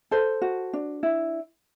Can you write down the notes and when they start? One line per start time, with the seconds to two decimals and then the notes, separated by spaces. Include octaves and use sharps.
0.11 A4 C5
0.42 F#4
0.73 D4
1.03 E4